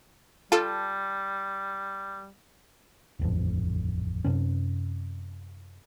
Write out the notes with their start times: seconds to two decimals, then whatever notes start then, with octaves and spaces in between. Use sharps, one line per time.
0.52 G3 F4 A4 A5
3.19 D#1 A1 F2
4.25 F#2 C3 C#4